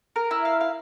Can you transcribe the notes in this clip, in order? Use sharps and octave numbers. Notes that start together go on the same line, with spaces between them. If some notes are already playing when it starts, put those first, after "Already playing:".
A#4
E4
F5
F5